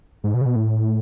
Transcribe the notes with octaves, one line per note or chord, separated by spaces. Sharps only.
G#2
B2
C#3
B2
A2